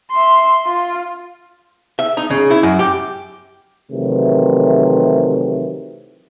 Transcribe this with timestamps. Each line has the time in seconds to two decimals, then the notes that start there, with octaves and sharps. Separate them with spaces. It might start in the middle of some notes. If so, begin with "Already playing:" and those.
0.11 E5 C6
0.66 F4
1.99 E5
2.17 D#4
2.30 C#3
2.50 E4
2.63 F#2
2.79 G4
3.91 C3 D#3 E3 F#3 A3